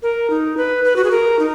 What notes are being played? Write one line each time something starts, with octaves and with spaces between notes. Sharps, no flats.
A#4
D#4
B4
B4
F#4
G#4
A#4
D#4